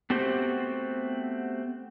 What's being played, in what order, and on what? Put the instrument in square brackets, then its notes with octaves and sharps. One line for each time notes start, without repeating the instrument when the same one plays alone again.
[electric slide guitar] A3 B3 C4 F#4 G4 C5